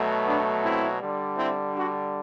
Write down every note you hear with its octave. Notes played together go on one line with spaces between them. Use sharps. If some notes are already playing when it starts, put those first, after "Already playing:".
Already playing: B2 F#3 A3
B3 D4
C4 E4
D3 G3
C4 E4
D4 F#4